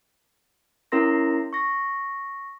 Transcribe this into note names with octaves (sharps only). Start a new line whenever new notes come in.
C#4 E4 A#4 C6 A#6
C#6 A#6